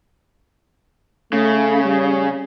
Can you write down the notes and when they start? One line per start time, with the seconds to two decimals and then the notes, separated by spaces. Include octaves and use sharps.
1.33 C#3 A3
1.84 G3